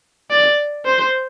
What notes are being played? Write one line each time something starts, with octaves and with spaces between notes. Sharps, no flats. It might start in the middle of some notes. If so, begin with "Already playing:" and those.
D5
C5